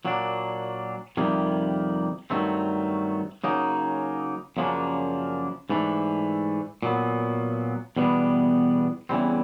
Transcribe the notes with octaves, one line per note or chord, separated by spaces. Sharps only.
A#2 F#3 A#3 D4
F2 C3 D#3 G3 A#3
G2 D#3 F#3 A3 C4
C#3 F#3 A#3 D#4
F#2 C#3 F3 A#3 D4
G#2 E3 A3 D4
A#2 F#3 B3
E2 B2 G3 B3 D4
E2 C#3 E3 G3 C4